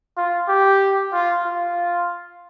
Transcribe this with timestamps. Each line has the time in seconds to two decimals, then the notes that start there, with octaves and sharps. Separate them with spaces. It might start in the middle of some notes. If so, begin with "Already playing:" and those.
0.17 F4
0.48 G4
1.13 F4
1.45 F4